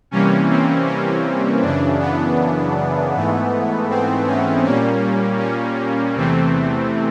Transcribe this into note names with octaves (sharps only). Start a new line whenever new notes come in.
C3 E3 G3 A#3 C#4
C4
C#4
F#2 C#3 E3 D4
B3
G#2 E3 A3
C4
C#4
A#2 G3 A#3 C#4
C#4
E2 C3 E3 A3 C4